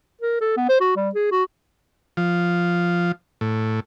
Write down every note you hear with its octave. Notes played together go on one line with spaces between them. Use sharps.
A#4
A4
B3
C5
F#4
G3
G#4
F#4
F3
A2